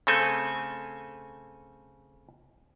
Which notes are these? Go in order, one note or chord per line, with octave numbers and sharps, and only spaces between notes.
C#3 A3 C4 A4 G#5